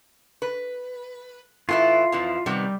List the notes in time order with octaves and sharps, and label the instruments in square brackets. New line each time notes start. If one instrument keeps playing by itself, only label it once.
[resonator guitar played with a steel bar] B4
[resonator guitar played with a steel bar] A2 E3 E4 [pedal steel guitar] F4
[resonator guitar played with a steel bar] F2 E3 F3
[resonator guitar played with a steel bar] C3 D#3 B3 [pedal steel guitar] G3